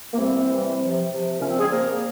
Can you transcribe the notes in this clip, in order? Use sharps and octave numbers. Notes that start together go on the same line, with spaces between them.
A#3
C3 E3 G3 C4
C3 E3 G3
C3 F3
C3 F3
A#2 C#3 F3 C#4
C4
G#3 G#4
A#2 F3 A#3 A#4